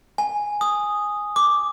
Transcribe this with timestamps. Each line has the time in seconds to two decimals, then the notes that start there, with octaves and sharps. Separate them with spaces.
0.18 G#5
0.61 D#6
1.36 D6